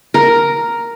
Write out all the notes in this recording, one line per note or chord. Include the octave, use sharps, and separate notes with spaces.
A#4